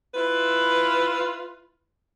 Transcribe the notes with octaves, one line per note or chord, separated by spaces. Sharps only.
E4 F4 B4